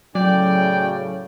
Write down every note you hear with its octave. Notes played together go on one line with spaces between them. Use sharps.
A2 C#3 F#3 C#4 D5 G5